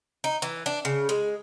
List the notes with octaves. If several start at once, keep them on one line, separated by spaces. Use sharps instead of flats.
D#4
E3
D4
C#3
G#3